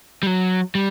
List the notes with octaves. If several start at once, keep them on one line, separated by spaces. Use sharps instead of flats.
G3
F#3
G3